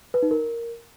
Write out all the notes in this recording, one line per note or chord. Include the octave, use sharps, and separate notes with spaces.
B4
D#4
A#4